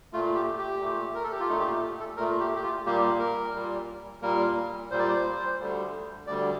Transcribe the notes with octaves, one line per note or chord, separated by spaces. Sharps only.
A#2 A3 F4
G4
G4
A#2 A3
A#4
A4
G4
F4
A#2 A3 D#4
G4
F4
A4
A#2 A3 A#4
G4
G4
F4
A#2 G3 A#3 G4
A#4
A#2 G3 A#3
A#2 G3 A#3 A#4
A#2 G3 A#3 C5
D5
C5
D2 D3 G3
D2 D3 G3 D5